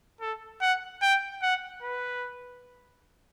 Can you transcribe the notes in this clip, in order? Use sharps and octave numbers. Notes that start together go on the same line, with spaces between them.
A4
F#5
G5
F#5
B4